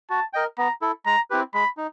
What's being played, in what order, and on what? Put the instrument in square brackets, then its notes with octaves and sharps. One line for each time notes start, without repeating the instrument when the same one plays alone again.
[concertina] F#4 [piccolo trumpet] A5
[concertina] A#4 D#5 G5
[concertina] B3 [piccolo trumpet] A#5
[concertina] E4 A4
[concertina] G#3 [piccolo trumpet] A#5
[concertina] C4 E4 G4 B4
[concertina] G#3 [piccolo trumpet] B5
[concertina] D#4